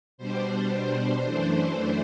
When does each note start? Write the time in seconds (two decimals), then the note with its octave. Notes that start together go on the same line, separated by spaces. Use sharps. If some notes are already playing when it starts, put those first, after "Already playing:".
0.18 B2 G3 D4 C5
0.70 C5
1.21 F#2 E3 A3 D4 C5